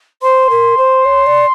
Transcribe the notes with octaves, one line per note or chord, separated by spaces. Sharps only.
C5 C6
A#4
C5
C#5
D5